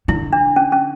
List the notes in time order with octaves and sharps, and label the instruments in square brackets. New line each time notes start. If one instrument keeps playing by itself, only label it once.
[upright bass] D3 [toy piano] E4
[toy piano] D4
C#4
C#4